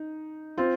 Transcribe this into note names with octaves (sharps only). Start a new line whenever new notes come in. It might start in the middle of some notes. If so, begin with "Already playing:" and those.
Already playing: D#4
C4 F4